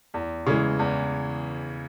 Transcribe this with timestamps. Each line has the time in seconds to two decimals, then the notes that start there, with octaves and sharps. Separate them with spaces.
0.14 E2
0.47 C#3 E3 G#3
0.79 E2